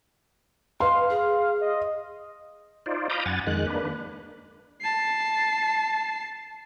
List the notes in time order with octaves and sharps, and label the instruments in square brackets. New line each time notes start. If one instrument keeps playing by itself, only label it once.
[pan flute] B4 [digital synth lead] F5 [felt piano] C6
[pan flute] G#4
[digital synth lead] D#5
[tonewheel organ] D#4 F4 C5 D5
F5 A#5 B5 D6 D#6 G6
F#2 F#5 G#5 A6
F2 D#3 G#3 F#6
A#3 D4 B4
[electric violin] A5 C7